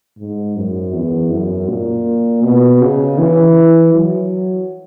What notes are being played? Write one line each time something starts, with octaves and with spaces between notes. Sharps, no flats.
G#2
F#2
E2
F#2
A#2
B2
C#3
E3
F#3